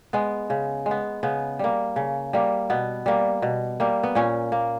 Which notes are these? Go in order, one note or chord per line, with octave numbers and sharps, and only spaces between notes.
G#3 B3
C#3
G#3
B3
C#3 B3
G3 A#3
C#3
G3 A#3
B2 B3
G3 A#3
B2
G3 A#3
B3
A#2 C#4
A#3